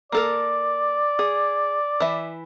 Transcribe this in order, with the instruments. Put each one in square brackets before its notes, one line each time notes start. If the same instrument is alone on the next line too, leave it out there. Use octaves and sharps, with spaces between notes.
[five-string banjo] A#3 A4 A#4 [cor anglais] D5
[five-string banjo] G#4
E3 E5